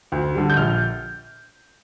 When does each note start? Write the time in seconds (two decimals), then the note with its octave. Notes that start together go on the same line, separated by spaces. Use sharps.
0.12 D2
0.35 D3 G3
0.50 G6
0.57 A#1 F6